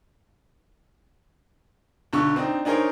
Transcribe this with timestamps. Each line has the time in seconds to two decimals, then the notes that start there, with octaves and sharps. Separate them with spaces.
2.13 B1 D3 C#6
2.36 C4 D4 D#4
2.65 D4 D#4 G#4 A#4 C5 C#5